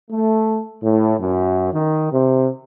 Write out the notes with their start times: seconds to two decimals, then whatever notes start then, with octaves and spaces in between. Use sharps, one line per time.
0.10 A3
0.83 A2
1.20 F#2
1.73 D#3
2.12 C3